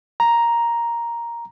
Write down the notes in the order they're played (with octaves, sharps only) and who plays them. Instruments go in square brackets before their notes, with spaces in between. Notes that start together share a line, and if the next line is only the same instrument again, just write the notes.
[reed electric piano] A#5